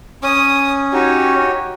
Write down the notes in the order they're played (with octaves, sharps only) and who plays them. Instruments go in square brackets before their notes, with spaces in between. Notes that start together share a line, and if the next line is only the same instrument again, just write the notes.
[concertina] C#4 [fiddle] D#6
[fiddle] D#4 [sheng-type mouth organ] F#4 G4 C#5